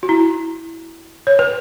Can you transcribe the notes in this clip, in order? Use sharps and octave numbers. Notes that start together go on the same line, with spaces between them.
F#4
E4
C#5
B4